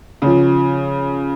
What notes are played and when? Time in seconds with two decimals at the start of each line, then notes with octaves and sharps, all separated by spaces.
0.22 C#3 F3